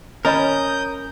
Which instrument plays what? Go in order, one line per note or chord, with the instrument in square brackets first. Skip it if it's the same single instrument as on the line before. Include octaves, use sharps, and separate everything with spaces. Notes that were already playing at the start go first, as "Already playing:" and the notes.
[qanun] C#4 [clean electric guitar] A#4 [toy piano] C#5 D#5 B5 [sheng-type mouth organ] D#6 G6